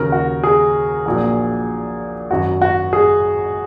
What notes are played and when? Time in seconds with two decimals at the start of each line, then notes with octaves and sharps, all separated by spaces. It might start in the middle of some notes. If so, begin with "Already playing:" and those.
Already playing: D#2 C#3 F#3 A#4
0.12 F#4
0.43 G#4
1.06 A#1 A#2 F#3
2.30 G#1 F#2 F#3 F#4
2.62 F#4
2.93 G#4